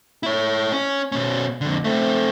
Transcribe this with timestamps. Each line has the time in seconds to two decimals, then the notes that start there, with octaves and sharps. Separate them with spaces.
0.23 E4 C#5
0.72 C#4
1.12 B2 C#4
1.61 F2 D3
1.84 A3 C4